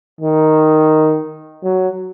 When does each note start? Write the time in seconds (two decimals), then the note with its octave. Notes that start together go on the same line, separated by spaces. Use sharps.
0.21 D#3
1.64 F#3